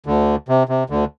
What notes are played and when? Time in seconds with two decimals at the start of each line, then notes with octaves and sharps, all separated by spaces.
0.06 D2 D3
0.49 C3
0.69 C3
0.90 D2 D3